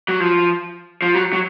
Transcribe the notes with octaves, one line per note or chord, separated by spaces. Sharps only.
F#3
F3
F3
F#3
F#3